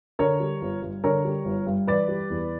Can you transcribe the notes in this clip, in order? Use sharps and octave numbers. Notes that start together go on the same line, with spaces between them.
D3 A#4 C#5
G3
G1
G2
D3 A#4 C#5
G3
G1
G2
E3 B4 D5
G3
E2